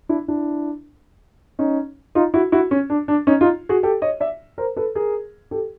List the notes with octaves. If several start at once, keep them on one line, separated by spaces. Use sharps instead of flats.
D4 E4
D4 E4
C#4 D#4
D#4 F4
E4 F#4
E4 F#4
C#4
D4
D4
C#4 D#4
D#4 F4
F#4 G#4
G4 A4
C#5 D#5
D5 E5
A#4 C5
A4 B4
G#4 A#4
G4 A4